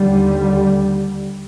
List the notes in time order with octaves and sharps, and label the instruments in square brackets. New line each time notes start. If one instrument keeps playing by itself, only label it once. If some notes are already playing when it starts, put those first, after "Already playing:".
Already playing: [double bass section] D#2 D3 G3